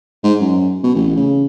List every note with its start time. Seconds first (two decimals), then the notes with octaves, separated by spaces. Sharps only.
0.24 G#2
0.40 F#2
0.83 B2
0.95 A1
1.17 C#3